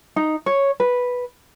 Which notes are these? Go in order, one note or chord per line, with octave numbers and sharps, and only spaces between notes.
D#4
C#5
B4